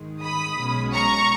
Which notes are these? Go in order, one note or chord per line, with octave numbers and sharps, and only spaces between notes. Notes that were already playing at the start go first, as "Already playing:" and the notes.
Already playing: G#2 D#3 G#3
B5 D#6
B1 B2 G#3 C#4
A#5 C#6